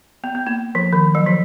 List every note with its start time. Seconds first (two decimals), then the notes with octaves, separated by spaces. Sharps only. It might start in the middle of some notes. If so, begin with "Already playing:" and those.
0.24 B3
0.35 B3
0.47 A#3
0.75 F3
0.93 D#3
1.15 F#3
1.26 F3